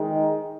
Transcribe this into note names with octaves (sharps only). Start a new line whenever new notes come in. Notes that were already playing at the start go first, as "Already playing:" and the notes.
Already playing: D#3 G#3